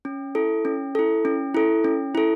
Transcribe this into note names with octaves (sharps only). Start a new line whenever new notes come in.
C#4
E4 A4
C#4
E4 A4
C#4
E4 A4
C#4
E4 A4